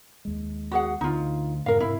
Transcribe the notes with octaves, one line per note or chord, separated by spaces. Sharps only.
D#2 G#3
F#4 G#4 F#5
D2 D#4 F4
F2 G#2 C3 A#4 F5
G#2 C3 C4 E4